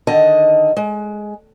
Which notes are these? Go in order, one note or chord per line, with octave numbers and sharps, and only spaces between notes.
D3 D#3 D#5 A5
G#3